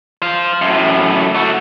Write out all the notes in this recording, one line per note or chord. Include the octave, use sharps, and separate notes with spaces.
C5 F5
F#2 A2
A3 F#4